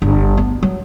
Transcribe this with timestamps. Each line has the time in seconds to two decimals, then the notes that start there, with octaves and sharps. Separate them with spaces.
0.02 G1
0.37 B3
0.63 F#3